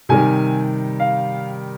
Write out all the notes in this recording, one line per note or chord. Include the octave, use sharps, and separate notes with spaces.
C3 D#3 G3 G#5
F5